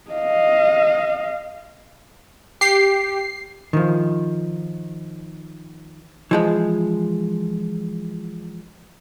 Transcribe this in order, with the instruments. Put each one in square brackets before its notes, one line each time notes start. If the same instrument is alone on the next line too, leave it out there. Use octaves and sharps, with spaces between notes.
[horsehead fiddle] D#5 F5
[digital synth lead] G4 [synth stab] C7
[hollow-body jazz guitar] D#3 F3
E3 F3 G#3